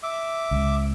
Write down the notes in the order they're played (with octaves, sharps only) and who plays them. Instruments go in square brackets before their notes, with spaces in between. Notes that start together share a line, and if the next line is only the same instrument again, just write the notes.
[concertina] E5 D6
[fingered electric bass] C#2